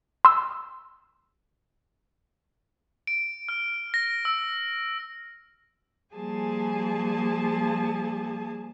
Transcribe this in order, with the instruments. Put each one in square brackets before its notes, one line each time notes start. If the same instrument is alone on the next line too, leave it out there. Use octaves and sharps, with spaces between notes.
[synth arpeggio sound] C6 E6
[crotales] D7
F6
A#6
E6
[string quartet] F3 G3 A#3 G#4 G#5 A5